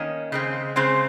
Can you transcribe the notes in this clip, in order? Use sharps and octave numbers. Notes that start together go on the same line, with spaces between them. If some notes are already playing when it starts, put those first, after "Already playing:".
Already playing: D#3 A#3 C#4 D#5
C#3 G#3 C4
C#3 G#3 C4 C5